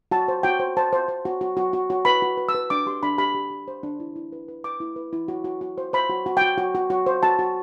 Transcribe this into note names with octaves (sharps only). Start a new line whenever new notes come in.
F#4 A5
C5
F#4 G5
C5
C5 A5
C5
C5
F#4
F#4
F#4
F#4
F#4
B4 B5
F#4
B4
E6
B4
D4 D6
G4 C6
D4 B5
G4 B5
G4
G4
C5
D4
E4
E4
B4
B4
B4 D6
E4
B4
E4
F#4
F#4
F#4
C5
C5 B5
F#4
F#4
F#4 G5
F#4
F#4
F#4
C5
F#4 A5
F#4